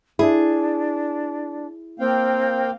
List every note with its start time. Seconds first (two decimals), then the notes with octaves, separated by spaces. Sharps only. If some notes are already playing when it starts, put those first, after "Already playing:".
0.19 D4 E4 G#4
1.99 A#3 C4 F5 G5